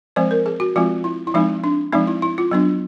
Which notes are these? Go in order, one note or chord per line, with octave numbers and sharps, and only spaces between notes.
F3 G#3 C4 C5
A#4
G#4
F#4
F3 G#3 C4 F4
E4
E4
F3 G#3 C4 D#4
D4
F3 G#3 C4 D#4
E4
E4
F4
F#3 B3 D4